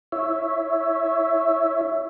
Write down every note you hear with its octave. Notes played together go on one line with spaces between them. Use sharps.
E4 C#5 E5